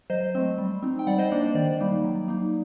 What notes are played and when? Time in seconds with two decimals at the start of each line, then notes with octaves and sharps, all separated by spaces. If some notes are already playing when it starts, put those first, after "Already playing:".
0.10 F#3 C5 D#5
0.35 A3 C4
0.58 G3
0.83 C4 D#4
0.99 G5
1.07 G3 D5 F#5
1.18 C5 D#5
1.31 A#3 D4 D5
1.44 C5
1.55 D#3 D5
1.80 G3 A#3 D#4
2.04 F#3
2.28 A#3 D#4